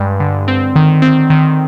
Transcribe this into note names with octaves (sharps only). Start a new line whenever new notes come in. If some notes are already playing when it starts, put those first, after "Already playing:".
Already playing: G2 G#3
D3
C4
D#3
C4
D#3